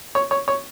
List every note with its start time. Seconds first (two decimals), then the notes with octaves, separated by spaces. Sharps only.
0.15 C#5
0.31 C#5
0.48 C#5